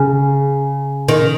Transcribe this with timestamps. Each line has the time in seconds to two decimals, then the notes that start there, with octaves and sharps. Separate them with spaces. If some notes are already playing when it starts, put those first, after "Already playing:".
Already playing: C#3
1.08 D#3